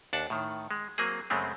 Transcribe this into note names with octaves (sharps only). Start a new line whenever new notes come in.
D#2 D4 F#5 A5
A2 D#3
G#3
F#3 A#3 C4 G#4
F#2 C#3 G#3 A3 C4